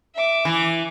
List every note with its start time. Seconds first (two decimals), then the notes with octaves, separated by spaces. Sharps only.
0.15 E5 D6
0.45 E3